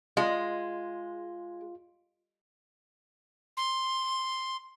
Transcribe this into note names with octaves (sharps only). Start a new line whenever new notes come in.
G#3 F4
C6